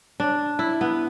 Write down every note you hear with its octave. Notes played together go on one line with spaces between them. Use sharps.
D4
E4
B3